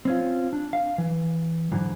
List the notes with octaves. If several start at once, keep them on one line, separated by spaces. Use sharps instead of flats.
C4 C#4 F4
D4
F5
E3
G#2 D3 E3 F#3